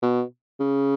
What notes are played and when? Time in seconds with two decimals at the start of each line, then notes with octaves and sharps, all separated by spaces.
0.02 B2
0.60 C#3